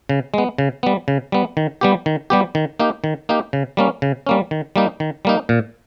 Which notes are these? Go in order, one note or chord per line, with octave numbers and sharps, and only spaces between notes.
C#3
G#3 B3
C#3
G3 B3
C#3
G3 B3
D#3
G3 B3 G4
D#3
G3 B3 G4
D#3
A#3 D#4 G4
D#3
A#3 D#4 G4
C#3
G3 A#3 C#4
C#3
G3 A#3 C#4
D#3
G3 A#3 D#4
D#3
G3 A#3 D#4
A#2